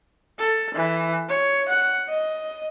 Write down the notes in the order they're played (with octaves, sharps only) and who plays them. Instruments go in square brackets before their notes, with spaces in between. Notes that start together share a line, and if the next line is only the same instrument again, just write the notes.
[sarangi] A4
E3
C#5
F#5
D#5